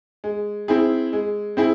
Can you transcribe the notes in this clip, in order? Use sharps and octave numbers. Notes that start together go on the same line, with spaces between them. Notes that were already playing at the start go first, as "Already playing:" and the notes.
G#3
C4 E4 G#4
G#3
C4 E4 G#4